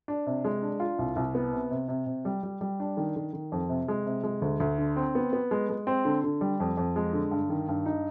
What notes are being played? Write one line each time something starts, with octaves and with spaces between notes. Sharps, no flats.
D4
C3
G#3
D4
F4
C2
C2
B3
C3
C3
C3
C3
G3
G3
G3
D4
D#3
D#3
D#3
F2
C3
G#3
C3
G#3
D2
D2
D3
C4
B3
B3
G#3
G#3
C4
D3
D3
G3
F2
F2
G#3
D3
G2
D#3
G2
D#4